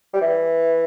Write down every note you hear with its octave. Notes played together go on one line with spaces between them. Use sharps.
G3
E3